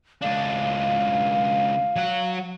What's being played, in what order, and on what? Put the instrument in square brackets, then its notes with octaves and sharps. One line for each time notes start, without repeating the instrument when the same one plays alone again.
[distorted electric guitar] C#2 D4 [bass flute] F5
[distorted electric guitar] F#3 F#5